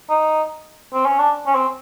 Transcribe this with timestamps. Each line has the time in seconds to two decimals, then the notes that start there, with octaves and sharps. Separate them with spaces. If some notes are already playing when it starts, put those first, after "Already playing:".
0.10 D#4
0.94 C4
1.06 C#4
1.19 D4
1.46 C#4
1.55 C4